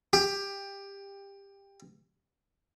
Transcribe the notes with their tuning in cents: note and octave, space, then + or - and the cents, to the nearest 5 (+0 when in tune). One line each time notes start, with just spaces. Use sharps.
G4 +15